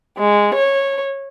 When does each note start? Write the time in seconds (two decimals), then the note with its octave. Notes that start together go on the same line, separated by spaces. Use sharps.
0.18 G#3
0.54 C#5